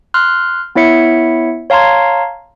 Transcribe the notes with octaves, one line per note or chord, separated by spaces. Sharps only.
C6 F6 F#6
B3 E4 C#5 E5 C#7
C#5 F5 A5 A#5 C6 G#6